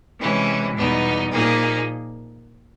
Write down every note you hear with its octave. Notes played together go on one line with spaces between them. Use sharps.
C3 E3 G#3 C#4 E4
E2 B2 G3 B3 D#4
A#2 F3 A#3 D#4 G#4